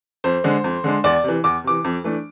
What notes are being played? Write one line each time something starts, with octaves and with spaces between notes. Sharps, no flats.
F2 C5
D3 G#3 D4
F2
D3 G#3 D4
E2 D5
C3 E3
E2 D6
C3 E3 D6
F2
E3 A3 D4